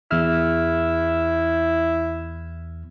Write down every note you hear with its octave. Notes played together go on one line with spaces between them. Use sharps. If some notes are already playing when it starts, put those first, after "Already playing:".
E2 E4 F6